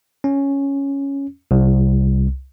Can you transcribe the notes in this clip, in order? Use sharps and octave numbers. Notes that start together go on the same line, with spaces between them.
C#4
C2